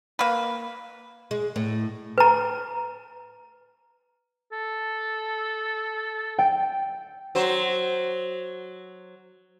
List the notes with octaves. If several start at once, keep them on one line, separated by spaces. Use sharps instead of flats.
A#3 B4
G#3
A2
B4 A#5
A4
G5
F#3 C5